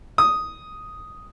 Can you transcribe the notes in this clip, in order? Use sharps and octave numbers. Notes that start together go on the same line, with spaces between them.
D#6